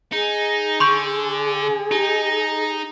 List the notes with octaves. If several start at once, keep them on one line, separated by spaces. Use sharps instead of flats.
D#4 G#4
D3 C6 C#6 G6
D#4 G4